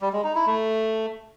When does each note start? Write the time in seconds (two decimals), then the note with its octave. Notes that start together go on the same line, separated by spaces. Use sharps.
0.02 G3
0.13 G#3
0.24 D#4
0.35 E4
0.46 A3